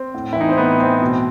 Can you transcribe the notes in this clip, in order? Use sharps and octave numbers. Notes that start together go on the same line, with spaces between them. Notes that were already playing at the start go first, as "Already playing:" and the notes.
Already playing: C4
A2
E3 E4
D#4
C4
A2 B3
E3 C4
B2